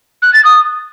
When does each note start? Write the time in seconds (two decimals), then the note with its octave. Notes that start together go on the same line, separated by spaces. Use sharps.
0.22 F#6
0.33 A6
0.44 D#6